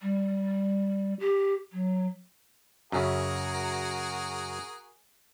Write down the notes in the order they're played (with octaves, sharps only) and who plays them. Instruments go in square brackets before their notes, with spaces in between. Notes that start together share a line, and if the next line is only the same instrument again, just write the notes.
[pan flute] G3
G4
F#3
[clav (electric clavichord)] F#2 C#3 [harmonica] F#4 G#4 A#4